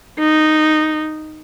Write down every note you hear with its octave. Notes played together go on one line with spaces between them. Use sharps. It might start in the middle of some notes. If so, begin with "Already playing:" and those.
D#4